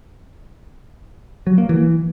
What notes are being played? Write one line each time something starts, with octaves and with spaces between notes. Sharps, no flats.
F#3
A#3
E3